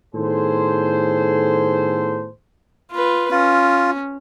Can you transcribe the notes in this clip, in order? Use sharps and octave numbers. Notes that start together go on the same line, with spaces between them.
A2 D#3 B3 G#4 A4 C5
F4 B4
C#4 F4